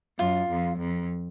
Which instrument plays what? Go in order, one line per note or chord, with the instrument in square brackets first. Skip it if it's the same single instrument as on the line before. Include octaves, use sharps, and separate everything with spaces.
[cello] F#2 [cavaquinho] F4
[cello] F2
F2